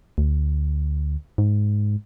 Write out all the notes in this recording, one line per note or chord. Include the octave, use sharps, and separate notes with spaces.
D2
G#2